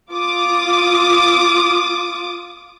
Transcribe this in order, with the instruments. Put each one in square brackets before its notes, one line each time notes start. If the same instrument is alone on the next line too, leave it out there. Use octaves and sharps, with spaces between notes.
[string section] F4 D6 D#6